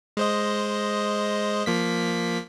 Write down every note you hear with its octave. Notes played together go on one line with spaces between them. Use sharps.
G#3 C5 D#5
F3 A#3 B6